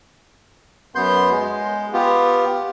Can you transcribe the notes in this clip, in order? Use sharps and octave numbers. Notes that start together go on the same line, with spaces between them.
F#2 B3 C6 G6
G#3
B3 F4 G4